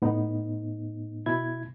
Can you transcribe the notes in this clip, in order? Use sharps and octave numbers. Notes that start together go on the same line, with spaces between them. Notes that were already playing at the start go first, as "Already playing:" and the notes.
A2 B3 D#4
B2 E4 G#6